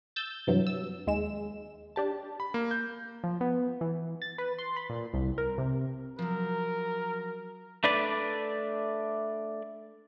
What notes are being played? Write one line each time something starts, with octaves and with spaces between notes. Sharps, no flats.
E6 G6 A6
G2 C3 E3 F#3
E6
D#2 G#3 E7
D4 G4 A5
B5
A#3
G6
F3
B3
E3
A6
B4
C6
B5
A#2
C2
A#4
C3
F3 F#3 A#4
A3 D4 B4 D5